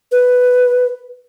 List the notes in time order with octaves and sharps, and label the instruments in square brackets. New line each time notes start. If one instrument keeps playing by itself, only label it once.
[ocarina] B4